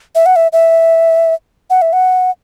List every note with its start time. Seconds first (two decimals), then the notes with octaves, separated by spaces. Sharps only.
0.15 E5
0.26 F#5
0.36 E5
0.53 E5
1.70 F#5
1.82 E5
1.93 F#5